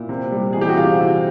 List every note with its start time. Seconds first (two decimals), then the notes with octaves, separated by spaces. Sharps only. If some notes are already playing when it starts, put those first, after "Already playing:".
Already playing: A#2 E4
0.09 C3
0.32 G3
0.53 E3 G#4
0.61 G4
0.69 F#4
0.77 C3 F4
1.00 C3